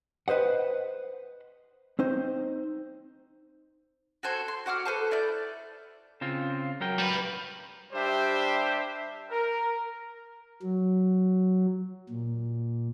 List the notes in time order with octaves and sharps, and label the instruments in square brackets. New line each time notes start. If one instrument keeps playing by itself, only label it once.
[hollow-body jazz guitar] B4 C5 D#5 F#5
C4 D#4 C5
[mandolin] F#4 A4 C5 G#5
C6
F#4 F#5 D6 F6
A4 B4 C5 A5
E4 D5 G6
[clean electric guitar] C#3 C4 F4
F#3 A#4 G5
[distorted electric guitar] G3 B4
[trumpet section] G3 D4 G4 C5 E5
A#4
[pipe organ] F#3
A#2